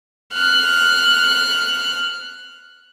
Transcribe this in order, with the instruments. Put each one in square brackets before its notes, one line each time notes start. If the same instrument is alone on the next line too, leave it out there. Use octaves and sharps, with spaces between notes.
[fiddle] F6 F#6